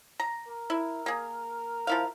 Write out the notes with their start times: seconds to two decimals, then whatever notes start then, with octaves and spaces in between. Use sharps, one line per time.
0.20 A#5
0.48 A#4
0.70 E4
1.06 A#3 G#4
1.87 F3 E4 A#4 F5